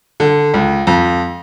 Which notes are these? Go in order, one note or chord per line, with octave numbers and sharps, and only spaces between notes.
D3
C#2
F2